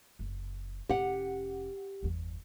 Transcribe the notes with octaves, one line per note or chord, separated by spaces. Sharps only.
F#1
F1 C#4 G4 F#5
G1 E2